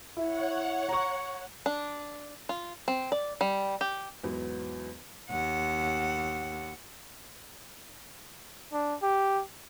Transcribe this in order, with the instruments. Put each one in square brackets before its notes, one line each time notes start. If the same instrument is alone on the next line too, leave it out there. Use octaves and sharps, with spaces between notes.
[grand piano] E4 [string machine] C#5 F#5
[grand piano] A#5 C#6
[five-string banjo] D4
F4
C4
D5
G3
G4
[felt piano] E2 G#2 F#3 B3
[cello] D#2 F#5
[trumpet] D4
G4